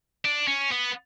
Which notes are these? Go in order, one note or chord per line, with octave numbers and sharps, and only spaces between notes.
D4
C#4
B3